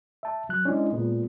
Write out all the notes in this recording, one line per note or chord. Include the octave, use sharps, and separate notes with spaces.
E5 A5
F#3 F#6
G#3 C#4 D4 E4
A#2 G#3 A#3 B3